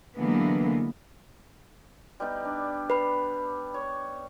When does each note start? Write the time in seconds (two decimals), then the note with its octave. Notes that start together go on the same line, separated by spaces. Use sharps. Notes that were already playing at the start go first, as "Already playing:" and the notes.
0.17 D3 E3 F#3 G#3 A#3 B3
2.20 G3 B3 D#4
2.45 D4
2.90 B4 B5
3.74 C#5